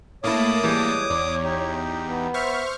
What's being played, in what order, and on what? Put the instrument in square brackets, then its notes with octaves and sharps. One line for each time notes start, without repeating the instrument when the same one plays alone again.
[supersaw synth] A2 A#3 A5 [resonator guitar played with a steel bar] A3 E4 [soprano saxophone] C#5 [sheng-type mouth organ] D6 D#6
[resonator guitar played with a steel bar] E3 G3 G#3
[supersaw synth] E2 [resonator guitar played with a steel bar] D5
[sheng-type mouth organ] D#4 G4
[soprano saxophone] B3
[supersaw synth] C5 C#6 F6 [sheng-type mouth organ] E5